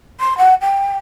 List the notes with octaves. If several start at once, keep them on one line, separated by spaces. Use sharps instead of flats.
C6
F#5
G5